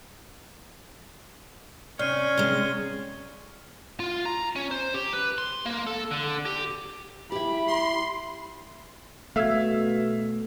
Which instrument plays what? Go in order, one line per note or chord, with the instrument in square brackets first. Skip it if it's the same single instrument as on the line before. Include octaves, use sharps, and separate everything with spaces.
[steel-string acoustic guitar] C3 [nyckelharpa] C#4 C#5 [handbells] D5 [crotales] F6 C7 D#7
[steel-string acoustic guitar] C3 G#3 [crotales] G7
[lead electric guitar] F4
A#5
C#4
C5
G4
B4
C6
A#3
A4
D3
G4
[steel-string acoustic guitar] E4 G4 [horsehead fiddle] B5
[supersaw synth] C6
[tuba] B2 [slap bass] A3 [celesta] A4 E6 G#6 [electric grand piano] E5 F5